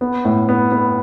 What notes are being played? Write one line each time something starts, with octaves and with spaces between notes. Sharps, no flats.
B3
A2
B3
B3